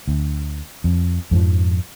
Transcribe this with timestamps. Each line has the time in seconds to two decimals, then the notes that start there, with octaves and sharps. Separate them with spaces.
0.08 D2
0.84 F2
1.31 F2 G#2 F3